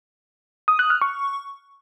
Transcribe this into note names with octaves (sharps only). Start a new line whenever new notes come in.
D#6
F#6
F6
C#6